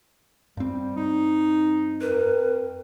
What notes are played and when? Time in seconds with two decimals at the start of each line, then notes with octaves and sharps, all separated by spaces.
0.57 G2 G3 C4
0.96 D#4
2.01 F2 A#4 B4